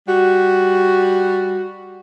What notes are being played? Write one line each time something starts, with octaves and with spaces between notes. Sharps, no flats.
G3 F#4